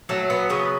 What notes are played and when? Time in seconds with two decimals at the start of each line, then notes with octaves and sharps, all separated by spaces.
0.09 F#3 A3
0.30 B3
0.50 C#3 B3